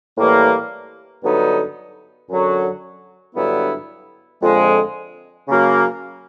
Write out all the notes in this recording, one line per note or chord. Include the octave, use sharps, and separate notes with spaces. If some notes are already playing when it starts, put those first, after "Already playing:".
A2 E3 G3 A#3
G2 D3 F#3 B3 D#4
F#2 D3 F#3
G2 D3 F#3 B3 E4
F2 D3 F3 G#3
C#3 F#3 A#3